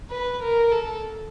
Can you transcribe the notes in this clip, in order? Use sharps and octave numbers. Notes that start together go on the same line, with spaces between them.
B4
A#4
A4